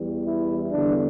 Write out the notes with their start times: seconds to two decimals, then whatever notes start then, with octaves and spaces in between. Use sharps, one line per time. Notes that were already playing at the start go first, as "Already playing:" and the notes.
Already playing: E2 E3 G3
0.26 E4
0.71 E2 D3 G3 D4